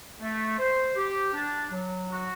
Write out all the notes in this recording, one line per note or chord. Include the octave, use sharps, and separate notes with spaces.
A3
C5
G4
D4
F#3
F#4